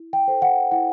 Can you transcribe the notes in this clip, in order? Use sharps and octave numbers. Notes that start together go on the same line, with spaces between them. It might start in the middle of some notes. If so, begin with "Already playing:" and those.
Already playing: E4
G5
A4 C5
F#5
E4 F#5